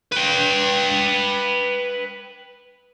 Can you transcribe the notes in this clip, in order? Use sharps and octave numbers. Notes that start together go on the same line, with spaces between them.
B4 G5